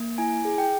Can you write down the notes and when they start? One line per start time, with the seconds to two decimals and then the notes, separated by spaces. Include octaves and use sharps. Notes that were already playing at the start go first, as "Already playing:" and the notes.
Already playing: A#3
0.18 E4 G#5
0.45 G#4
0.58 G5